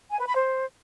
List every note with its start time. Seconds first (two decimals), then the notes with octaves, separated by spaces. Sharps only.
0.11 G#5
0.19 B4
0.27 B5
0.35 C5